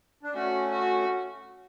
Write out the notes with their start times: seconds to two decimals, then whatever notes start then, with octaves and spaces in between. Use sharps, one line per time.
0.23 D4
0.34 A3 C#4 F#4
0.71 F#4